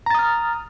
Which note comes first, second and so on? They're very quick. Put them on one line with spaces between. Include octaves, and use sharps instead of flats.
A#5 A6 D#6 F6